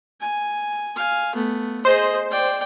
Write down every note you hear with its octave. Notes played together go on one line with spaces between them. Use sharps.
G#5
F5 G#5
A3 B3
G#4 C5 D#5
D5 G5